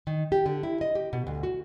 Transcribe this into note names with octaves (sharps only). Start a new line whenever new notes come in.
D#3
G4
D3
E4
D#5
G4
B2
D2
F#4